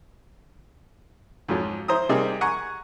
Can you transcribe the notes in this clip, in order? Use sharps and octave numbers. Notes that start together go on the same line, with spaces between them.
F2 G#2 F3 F#3
E4 C5 A#5 D#6
C3 G3 A#3 C4 D#4 G#4
F#5 G#5 A#5 C#6